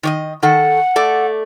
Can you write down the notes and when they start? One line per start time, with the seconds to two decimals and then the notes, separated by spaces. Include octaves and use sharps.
0.03 D#3 D5 D#5
0.43 D#3 A4 F#5
0.96 A3 A4 D5